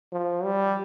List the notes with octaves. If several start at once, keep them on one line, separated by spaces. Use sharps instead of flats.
F3
G3